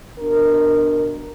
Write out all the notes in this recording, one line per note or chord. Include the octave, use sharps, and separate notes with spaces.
B2 D4 A#4